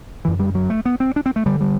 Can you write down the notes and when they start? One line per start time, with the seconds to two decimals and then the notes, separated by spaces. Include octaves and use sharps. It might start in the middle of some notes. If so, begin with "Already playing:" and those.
0.25 F#2 D3 E3
0.40 G3
0.55 F#3
0.70 A3
0.85 B3
1.00 C4
1.16 D4
1.26 C4
1.36 A3
1.46 G2 D3 G3
1.61 G3